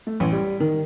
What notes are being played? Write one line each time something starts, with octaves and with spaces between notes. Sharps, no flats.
A3
A1
G3
D#3